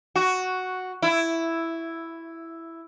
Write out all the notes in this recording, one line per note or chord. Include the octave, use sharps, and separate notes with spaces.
F#4
E4